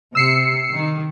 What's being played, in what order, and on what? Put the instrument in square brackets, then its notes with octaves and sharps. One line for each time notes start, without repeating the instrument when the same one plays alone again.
[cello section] C3 [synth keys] E6 C7 C#7
[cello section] D#3